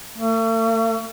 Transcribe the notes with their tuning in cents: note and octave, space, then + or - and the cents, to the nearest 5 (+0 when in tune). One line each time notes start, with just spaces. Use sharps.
A3 +45